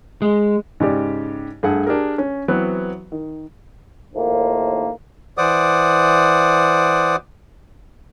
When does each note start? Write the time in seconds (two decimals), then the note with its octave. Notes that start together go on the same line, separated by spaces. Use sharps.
0.22 G#3
0.80 G#2 C#3 G4 D5
1.63 G2 A3 G#4 A4 F#5
1.87 D4 G4 G#4 A#4
2.18 C#4
2.48 E3 F#3 B3 C4
3.12 D#3
4.15 D#2 A2 D#3 F3 A#3
5.38 E3 C5 D5 F#5 D6 D#6